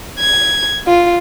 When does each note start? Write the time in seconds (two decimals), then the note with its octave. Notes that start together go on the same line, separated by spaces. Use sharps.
0.19 G#6
0.87 F4